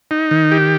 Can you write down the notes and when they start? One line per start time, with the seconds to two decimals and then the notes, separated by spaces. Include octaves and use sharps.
0.11 D#4
0.31 D#3
0.51 G4